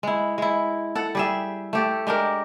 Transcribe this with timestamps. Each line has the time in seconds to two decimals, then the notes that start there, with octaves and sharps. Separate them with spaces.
0.03 G#3 E4
0.38 G#3 E4
0.95 A4 F#5
1.15 G3 G#4 E5
1.73 A3 G4 A4
2.07 G#3 D4 G4 A#4